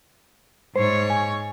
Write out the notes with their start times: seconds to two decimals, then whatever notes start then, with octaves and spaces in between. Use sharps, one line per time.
0.76 G#2 C5 C#5
1.10 G#5